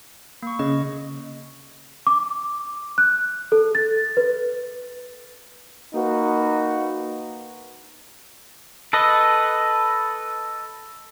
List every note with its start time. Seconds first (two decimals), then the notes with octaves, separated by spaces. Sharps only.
0.43 A#3 C#6
0.59 C#3 D#5
2.07 D6
2.98 F#6
3.52 A4
3.75 A6
4.17 B4
5.94 A#3 D#4 F#4 B4
8.93 A4 B4 D#5